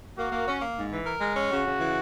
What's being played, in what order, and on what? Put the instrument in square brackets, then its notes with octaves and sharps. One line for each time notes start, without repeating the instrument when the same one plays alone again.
[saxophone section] A#3 [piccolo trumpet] F#4
[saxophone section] A#3
C#4
A#3
G#2
E3
A#4
G#3
C#4
[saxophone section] C#3 [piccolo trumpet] F#4
[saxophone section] C#3
E3